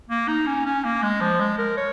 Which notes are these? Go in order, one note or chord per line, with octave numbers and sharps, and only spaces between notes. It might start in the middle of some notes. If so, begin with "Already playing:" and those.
A#3
D#4
C#4
C#4
A#3
G#3
F3
G#3
A#4
C#5